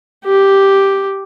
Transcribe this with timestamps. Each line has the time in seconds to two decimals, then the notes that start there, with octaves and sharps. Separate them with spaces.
0.24 G4